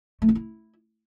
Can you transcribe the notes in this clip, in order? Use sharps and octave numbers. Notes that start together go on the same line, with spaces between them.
A3
F4
E4